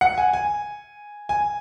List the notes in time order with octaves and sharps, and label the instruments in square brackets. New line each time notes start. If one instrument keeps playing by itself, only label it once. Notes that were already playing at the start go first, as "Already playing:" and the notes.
[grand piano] F#5
G#5
G#5
G#5